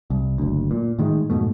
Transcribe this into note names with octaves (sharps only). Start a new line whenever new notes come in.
C2
F#1 D2
A#2
A2 D#3 G#3
F2 G#2 B2 A3